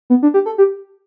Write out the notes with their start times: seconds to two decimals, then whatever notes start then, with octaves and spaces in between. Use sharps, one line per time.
0.10 B3
0.23 D4
0.34 G4
0.46 A4
0.58 G4